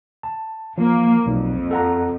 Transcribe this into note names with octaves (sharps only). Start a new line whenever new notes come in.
A5
F3 A#3
B1 F2
A4 F#5 A#5